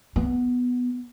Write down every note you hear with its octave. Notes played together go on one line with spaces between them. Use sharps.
B3